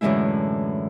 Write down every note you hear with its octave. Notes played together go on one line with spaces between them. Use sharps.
F#2 A2 D3 E3 G#3 E4